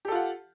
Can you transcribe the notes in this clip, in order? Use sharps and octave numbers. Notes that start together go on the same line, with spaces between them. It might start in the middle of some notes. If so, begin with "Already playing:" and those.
F4 G4 A4 F#5